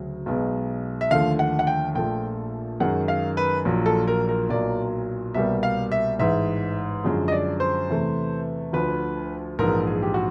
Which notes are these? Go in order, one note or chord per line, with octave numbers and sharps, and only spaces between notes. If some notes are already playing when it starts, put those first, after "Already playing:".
Already playing: D2 C#3 F#3
B1 B2 G#3
E5
D#2 D3 F3 A3 F5
F#5
F#5
G5
A#1 A#2 F3 A3 G5
F#2 D#3 G#3 F#5
F5
B4
A#1 A#2 F#3
A4
A#4
A#4
B1 A#2 F#3 A#3 D5
C2 B2 G3 A#3 E5
F5
E5
A1 G#2 E3 E5
F#2 D3 F3 G#3
D#5
D5
C5
E2 C3 E3 A3
D2 D3 F3 B4
A#1 G#2 E3 A#4
G#4
G4
F#4